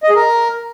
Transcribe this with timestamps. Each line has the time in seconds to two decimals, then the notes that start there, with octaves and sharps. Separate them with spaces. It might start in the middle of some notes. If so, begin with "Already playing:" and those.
0.03 D#5
0.10 G#4
0.16 A#4